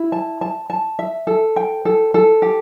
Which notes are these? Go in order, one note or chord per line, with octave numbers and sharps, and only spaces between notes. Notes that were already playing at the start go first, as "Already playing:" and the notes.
Already playing: E4
A5
A5
A5
E5
A4
G5
A4
A4
G4